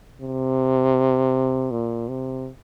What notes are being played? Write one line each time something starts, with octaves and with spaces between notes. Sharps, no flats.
C3
A#2
C3